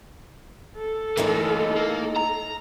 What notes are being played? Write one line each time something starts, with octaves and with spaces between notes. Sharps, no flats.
A4
A2 E3 G#3 A#3 D#4
A#3
A#5